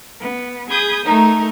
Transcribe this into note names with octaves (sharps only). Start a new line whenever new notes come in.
B3
G#4 B5 D#6 G6 G#6
A3 D#4 A#4